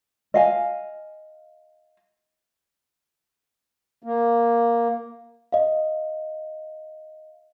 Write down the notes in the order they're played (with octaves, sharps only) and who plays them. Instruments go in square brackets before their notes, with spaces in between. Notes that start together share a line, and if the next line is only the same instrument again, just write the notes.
[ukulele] D#5 F5 G#5
[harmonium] A#3
[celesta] D#5 F5